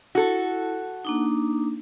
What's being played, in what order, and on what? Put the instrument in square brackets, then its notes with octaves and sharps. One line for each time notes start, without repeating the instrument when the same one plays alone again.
[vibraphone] E4 [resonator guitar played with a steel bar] F#4 A4
[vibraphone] A#3 D4 D#4